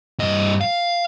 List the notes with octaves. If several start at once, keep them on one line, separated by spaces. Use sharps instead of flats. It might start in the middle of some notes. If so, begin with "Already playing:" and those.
G2 D#5
F5